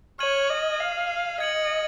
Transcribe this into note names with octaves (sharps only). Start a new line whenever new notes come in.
C#5 F6 G#6 D#7 F#7
D#5
F5
D#5 G#6 C#7 F#7